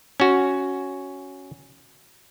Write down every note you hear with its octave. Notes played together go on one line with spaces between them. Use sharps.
C#4 F#4